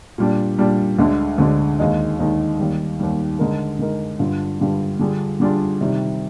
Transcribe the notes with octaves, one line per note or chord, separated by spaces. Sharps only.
A#2 G3 D4
A#2 G3 D4
D2 D3 G#3 D4
D2 D3 G#3 D4
D#2 D#3 G#3 D#4
D#2 D#3 G#3 D#4
D#2 D#3 G3
D#2 D#3 G3
D3 G#3 D#4 A#4
D3 G#3 D#4 A#4
G2 D3 G3 D4 F4
G2 D3 G3 D4 F4
D3 G3 D4 F4 G#4
D3 G3 D4 F4 G#4
C3 D#3 G3